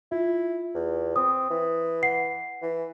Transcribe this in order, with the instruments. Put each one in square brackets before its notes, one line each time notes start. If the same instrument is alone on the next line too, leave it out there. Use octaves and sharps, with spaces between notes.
[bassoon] E4 [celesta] F4
[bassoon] E2
[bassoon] C4 [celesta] D#6
[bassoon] E3
[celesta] F#5 C7
[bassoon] E3